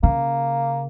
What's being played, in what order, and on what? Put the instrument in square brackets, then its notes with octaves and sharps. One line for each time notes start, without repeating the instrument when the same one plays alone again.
[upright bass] C#3 [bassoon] A#3